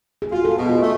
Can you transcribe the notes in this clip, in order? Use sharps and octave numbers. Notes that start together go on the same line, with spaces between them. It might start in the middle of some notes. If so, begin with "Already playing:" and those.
G#4
F4 F#4
A4
G#4
B2
F4
A3